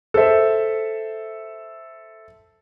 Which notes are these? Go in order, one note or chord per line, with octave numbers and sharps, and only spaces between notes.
A4 C5 E5